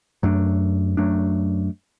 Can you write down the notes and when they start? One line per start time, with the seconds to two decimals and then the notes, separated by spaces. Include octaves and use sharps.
0.23 F#2 F#3 A3 D4
0.97 F#2 F#3 A3 D4